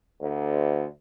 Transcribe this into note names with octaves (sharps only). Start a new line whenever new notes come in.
D2